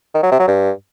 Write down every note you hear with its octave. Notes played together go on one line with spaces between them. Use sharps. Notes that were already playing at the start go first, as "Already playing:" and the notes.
D#3
F#3
C3
F#3
G2